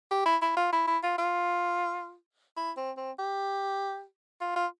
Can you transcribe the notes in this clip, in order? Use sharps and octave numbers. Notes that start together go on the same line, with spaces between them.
G4
E4
E4
F4
E4
E4
F4
F4
E4
C4
C4
G4
F4
F4